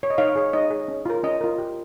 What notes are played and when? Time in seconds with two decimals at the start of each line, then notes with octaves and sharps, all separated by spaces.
0.03 C#5
0.10 D#5
0.18 D#4 C#5 F5
0.36 G#4 C#5
0.53 D#4 D#5
0.71 G#4 C#5
0.88 C#4
1.06 F4 A#4
1.23 C#4 D#5
1.41 F4 A#4
1.59 G4